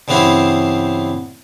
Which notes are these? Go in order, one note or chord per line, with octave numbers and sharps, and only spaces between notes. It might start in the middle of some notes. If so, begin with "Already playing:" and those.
G2 C#3 E3 B3 C4 E4